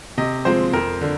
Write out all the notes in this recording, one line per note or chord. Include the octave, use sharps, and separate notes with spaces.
C3 D#5
F3 G#3 C4 C5
F2 A#4
D3